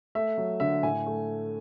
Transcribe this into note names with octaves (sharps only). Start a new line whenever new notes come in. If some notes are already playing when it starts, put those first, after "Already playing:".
A3 E5
F#3
D3 E5
A2 G#5
A3